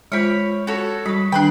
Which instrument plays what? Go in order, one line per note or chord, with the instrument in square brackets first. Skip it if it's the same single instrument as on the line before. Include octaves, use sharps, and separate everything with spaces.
[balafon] G#3 F4 C5 [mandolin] C#5 B5
[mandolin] F#4 A4 C#5
[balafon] G3 C#6 [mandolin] B5
[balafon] D#3 G3 D4 [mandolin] G5 B5 F#6